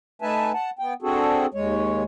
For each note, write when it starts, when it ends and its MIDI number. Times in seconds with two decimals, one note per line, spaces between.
0.22 0.52 57
0.22 0.52 63
0.22 0.52 71
0.22 0.52 76
0.22 0.52 80
0.22 0.52 81
0.53 0.70 78
0.53 0.70 81
0.79 0.94 59
0.79 0.94 79
1.02 1.46 60
1.02 1.46 62
1.02 1.46 66
1.02 1.46 68
1.02 1.46 69
1.54 2.04 39
1.54 2.04 56
1.54 2.04 73